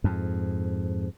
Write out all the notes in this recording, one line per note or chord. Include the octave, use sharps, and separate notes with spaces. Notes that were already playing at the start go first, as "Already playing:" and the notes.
F2 G#2